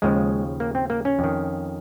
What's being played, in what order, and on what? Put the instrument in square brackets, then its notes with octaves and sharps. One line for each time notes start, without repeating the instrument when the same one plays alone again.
[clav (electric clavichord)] D#2 C#3 F3 G#3
A#3
C4
A#3
C#4
F2 D#3